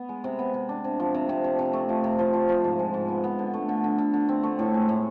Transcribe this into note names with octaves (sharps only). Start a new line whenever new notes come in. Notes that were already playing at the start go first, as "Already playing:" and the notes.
Already playing: B3
G#3
C3
B3
C3
D4
C3
F3
C3
C3
C3
C3
A3
F3
C3
F3
F3
F3
G#2
G#3
G#2
B3
B3
D3
A3
D3
D3
D3
D3
C4
A3
A2
G#3
A2